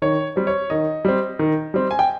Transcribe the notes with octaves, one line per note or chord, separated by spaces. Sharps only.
D#3 C#5
G3 C4
C#5
D#3 D#5
G3 C4
D#3
G3 C4
G#5
G5